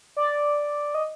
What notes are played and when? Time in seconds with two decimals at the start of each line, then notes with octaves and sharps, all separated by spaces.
0.16 D5
0.95 D#5